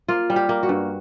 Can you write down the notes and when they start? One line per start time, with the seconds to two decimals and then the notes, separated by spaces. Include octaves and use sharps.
0.08 A#3 F4
0.30 G3
0.36 G4
0.49 A#3
0.63 F#4
0.69 G2